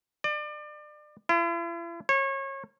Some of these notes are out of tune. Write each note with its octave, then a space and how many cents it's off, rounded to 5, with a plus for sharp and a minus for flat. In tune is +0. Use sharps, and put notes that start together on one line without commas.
D5 +30
E4 +45
C#5 -30